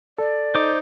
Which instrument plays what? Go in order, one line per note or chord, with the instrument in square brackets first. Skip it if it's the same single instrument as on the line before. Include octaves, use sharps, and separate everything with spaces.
[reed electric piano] A4 [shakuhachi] D5
[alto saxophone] D#4 [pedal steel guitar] C5 D6